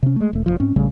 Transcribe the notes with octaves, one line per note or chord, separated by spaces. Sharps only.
C3 C#4
G#3 A3
E1 A3
F1 C2 F3
G#2 C4 C#4
A#1 C#3 G3 A3